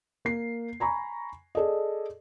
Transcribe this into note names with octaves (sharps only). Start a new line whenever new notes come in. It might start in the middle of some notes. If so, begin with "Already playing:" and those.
A#3 C7
G#5 A#5 B5 C#6
G#4 A4 D5 D#5